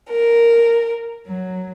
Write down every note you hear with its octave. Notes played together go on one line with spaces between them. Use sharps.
A#4
F#3